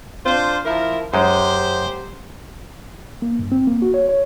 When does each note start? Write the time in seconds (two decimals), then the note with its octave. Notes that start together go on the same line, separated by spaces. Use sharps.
0.26 D4 F4 C5
0.65 F3 E4 A#4
1.14 F#2 G#3 G4 C5
3.22 A#3
3.39 G2
3.52 C4
3.67 A#3
3.82 F#4
3.94 C#5
4.09 C#5